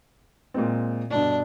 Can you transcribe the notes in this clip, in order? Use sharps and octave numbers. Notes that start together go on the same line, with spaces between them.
A#2 G#3 C4
G2 B2 D3 D4